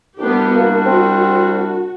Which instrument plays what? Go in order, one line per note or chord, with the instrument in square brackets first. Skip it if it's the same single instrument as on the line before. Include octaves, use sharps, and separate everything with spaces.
[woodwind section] C2 G3 D4 [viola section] B3 G4
[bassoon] A#3 [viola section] F#4
[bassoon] C4